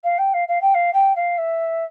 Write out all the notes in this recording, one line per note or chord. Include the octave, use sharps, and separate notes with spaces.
F5
G5
F5
F5
G5
F5
G5
F5
E5